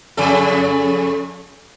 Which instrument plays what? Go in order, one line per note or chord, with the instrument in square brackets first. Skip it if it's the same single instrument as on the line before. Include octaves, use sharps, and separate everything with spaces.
[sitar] F2 C#3 A4